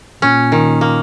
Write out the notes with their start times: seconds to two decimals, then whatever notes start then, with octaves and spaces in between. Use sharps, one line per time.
0.22 A#2 C#4
0.52 D#3
0.81 A#3